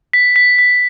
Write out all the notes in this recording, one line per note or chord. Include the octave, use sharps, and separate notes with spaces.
B6
B6
B6